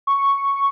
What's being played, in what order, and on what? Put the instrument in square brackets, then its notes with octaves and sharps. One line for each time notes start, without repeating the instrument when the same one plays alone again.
[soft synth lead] C#6